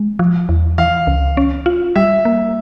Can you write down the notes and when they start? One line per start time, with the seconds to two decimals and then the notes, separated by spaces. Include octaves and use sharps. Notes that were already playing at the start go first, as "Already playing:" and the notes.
Already playing: G#3
0.19 F3
0.49 E2
0.78 E3 F5
1.07 C#2
1.37 C#4
1.66 F4
1.96 G3 E5
2.25 A#3